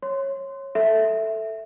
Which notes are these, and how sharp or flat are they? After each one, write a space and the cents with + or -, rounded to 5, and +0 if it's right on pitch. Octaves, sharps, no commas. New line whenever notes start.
C#5 -20 C6 -10
A4 +0 E5 +0